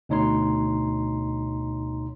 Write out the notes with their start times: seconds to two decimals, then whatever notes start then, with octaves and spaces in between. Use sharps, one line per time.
0.09 D2 B2 D#4 C#5 A#5 C6